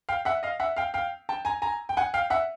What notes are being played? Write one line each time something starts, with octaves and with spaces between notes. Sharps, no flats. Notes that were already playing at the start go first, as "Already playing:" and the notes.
F5 G5
E5 F#5
D#5 F5
E5 F#5
F5 G5
F5 G5
G5 A5
G#5 A#5
G#5 A#5
G5
F#5 G#5
F5 G5
E5 F#5